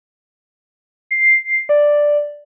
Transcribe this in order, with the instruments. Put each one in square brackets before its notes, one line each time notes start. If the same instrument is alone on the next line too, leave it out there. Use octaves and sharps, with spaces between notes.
[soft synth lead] C7
D5